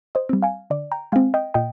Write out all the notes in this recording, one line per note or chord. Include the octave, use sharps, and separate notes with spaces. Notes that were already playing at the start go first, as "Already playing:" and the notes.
C5 D#5
G3 C4
F5 G#5
D3 D5
G5 A#5
G#3 C4 F5 G#5
D#5 G5
A#2 D#5 G5